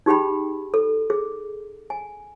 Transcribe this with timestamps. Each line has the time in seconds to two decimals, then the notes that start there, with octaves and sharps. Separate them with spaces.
0.06 D#4 G4 G#4 G5 B5
0.74 A4
1.10 G#4
1.90 G#5